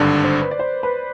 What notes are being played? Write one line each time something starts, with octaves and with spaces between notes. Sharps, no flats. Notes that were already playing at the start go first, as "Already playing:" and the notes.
Already playing: G#1 G2 D3 D5
C5
B4
D5
C5
B4